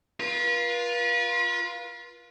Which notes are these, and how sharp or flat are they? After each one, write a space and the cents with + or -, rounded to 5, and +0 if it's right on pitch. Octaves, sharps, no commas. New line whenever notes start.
F4 +0 B4 -40